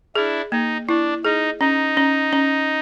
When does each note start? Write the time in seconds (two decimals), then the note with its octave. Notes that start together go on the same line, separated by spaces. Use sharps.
0.15 D4 E4 G#4
0.52 A#3 D#4
0.88 D4 E4
1.25 D#4 G#4
1.60 C#4 D#4
1.97 C#4
2.33 C#4